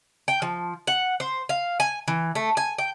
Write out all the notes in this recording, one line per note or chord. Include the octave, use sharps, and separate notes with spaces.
G5
F3
F#5
C5
F5
G#5
E3
A3
G#5
G5